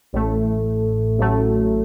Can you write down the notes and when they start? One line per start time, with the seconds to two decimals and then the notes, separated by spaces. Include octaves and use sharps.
0.13 A1 A2 A3
1.18 A1 A2 F#3 A3